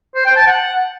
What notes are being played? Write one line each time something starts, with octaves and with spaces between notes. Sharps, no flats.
C5
G5
A5
F#5